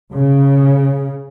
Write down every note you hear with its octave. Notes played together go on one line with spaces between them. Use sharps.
C#3